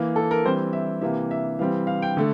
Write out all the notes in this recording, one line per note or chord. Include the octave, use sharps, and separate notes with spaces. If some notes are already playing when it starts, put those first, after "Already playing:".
Already playing: E3 A#3
A4
A#4
E3 G3 C4 C5
E5
C3 E3 A#3 E5
E5
E3 G3 C4 F5
F5
G5
D3 A3